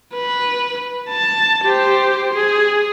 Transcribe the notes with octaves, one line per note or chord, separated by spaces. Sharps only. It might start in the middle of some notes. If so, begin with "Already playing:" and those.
B4
A5
G4 C5
G#4